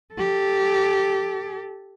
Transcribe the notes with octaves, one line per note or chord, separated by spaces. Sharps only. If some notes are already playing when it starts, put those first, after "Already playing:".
G4 A4